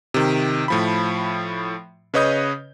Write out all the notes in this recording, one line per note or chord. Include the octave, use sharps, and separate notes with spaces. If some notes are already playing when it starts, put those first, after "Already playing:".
C3 D#3
A2 F3 B5
C#3 B4 C#5 D#5 D#6 G6